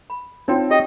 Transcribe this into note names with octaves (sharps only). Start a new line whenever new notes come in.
B5
C4 D#4 F4 C#5 G5
G4 D#5 G5 E6